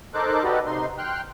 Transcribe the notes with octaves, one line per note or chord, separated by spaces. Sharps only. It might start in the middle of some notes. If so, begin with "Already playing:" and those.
D#4 A4 A#4 C5 D6 F#6
F#4 G4 A4 B4 D5 D#5
C3 D#4 C6
G5 C6 F6 F#6